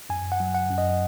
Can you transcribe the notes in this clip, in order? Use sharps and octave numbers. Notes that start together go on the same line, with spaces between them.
F#2 G#5
F#5
F#3
F#5
F#2
D#5